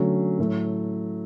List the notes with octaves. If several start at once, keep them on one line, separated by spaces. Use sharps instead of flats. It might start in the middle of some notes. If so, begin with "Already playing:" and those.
Already playing: D3 F#3 A3 C#4
A2 F#3 A3